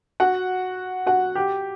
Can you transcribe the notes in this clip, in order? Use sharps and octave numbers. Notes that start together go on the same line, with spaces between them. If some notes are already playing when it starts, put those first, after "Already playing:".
F#4 F#5
F#4 F#5
G4 G5